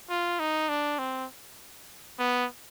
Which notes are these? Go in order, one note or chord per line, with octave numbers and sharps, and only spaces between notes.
F4
D#4
D4
C4
B3